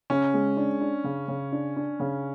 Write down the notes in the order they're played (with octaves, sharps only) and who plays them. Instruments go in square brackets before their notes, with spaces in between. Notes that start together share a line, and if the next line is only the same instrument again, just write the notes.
[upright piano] C#3 [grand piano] C#4
[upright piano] G#3
D4
D4
C#3
C#3
D4
D4
C#3